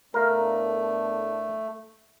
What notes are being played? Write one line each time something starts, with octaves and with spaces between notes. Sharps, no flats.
A2 A3 B3 D4 A#4 F5